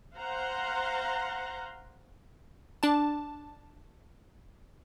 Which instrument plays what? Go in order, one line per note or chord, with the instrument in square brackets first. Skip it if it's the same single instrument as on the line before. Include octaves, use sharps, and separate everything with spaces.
[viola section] C5 F5 F#5 A#5 C6
[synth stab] D4 A5